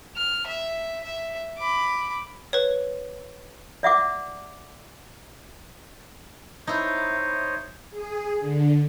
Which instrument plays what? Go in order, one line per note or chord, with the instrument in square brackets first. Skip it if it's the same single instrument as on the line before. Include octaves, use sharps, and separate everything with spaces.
[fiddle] F6
E5
E5
B5 D6
[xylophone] B4 C#5
[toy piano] D5 E5 F#5 D6
[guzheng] D#4 E4 [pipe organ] C5 C#5 D#5
[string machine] G#4
D3